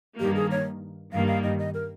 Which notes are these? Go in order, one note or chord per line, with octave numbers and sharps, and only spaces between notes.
G2 D#3 A#3 G4
G#4
C#5
G2 D#3 G3 A#3 F5
F5
D#5
D#5
A#4